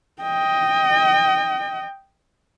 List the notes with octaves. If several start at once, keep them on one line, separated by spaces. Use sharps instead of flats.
D#5 G5